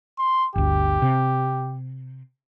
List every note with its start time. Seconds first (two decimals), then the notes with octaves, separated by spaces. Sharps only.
0.19 C6
0.56 G1 D2 G4
1.02 C3